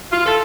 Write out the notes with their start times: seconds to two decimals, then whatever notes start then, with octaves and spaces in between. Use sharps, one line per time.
0.12 F4
0.26 A4